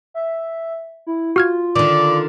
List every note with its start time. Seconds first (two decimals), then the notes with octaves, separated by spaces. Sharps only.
0.14 E5
1.07 E4
1.36 F4 F#4 F6 G#6
1.76 D3 D#3 D5